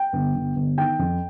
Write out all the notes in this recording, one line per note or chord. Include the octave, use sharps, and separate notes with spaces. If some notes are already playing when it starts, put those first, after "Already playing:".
Already playing: G5
G1
G1
G1
D#3 G5
F2